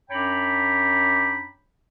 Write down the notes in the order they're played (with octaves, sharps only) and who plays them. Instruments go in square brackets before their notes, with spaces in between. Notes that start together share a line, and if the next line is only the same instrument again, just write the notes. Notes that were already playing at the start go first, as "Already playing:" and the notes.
[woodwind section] F#2 D4 C#5 G5 A#5 B5